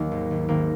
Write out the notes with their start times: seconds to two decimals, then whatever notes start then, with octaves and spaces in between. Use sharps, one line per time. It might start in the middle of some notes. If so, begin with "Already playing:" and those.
Already playing: D#2 D#3 F#3 A#3 D#4
0.11 G#1
0.31 G#1
0.48 G#1 A#3